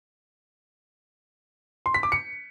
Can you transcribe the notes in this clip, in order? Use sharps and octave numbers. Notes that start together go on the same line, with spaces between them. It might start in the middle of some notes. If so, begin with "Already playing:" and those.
C6
B6
D6
C#7